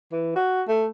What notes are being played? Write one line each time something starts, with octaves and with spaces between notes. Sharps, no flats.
E3
F#4
A3